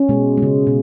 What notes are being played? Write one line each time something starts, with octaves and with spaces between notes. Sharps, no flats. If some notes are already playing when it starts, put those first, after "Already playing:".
Already playing: C#4
B2 G#3
G#3
C#3
B2